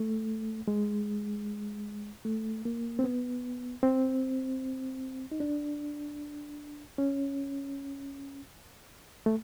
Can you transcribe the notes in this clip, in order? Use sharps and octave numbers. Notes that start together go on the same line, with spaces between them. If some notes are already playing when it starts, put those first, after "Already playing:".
Already playing: A3
G#3
A3
A#3
C4
B3
C4
D#4
D4
C#4
A3